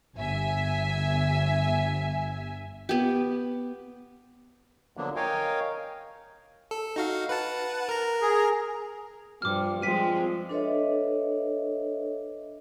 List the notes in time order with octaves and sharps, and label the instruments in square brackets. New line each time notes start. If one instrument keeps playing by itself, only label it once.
[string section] G1 E5 G#5
[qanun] B3 G4
[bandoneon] D3 F3 F#3 A#3 B3 D4
A#4 C#5 D#5 F5 G5 G#5
[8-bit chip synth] A4
D#4 F#4 F5
B4 F#5 A5
A#4 A#5
[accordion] G#4
[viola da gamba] G2 F3 [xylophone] D6 F6
[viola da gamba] F3 G#3 C4 [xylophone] G5 B6 D#7
[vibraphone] D4 A4 B4 C#5 D#5 E5